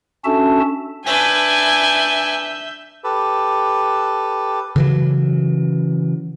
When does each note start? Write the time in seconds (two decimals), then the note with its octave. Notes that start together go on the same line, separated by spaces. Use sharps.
0.25 C#4 D4 F#4 A4 E5 A5
1.06 D4 B4 E5 G#5 G6
3.04 G4 A4 B4
4.76 C#3 E3 F#3